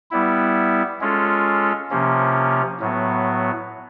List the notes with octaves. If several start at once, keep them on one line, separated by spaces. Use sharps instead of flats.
G3 B3 E4
G#3 C#4 F4 A4
C3 F3 A#3 C#4
A2 F#3 B3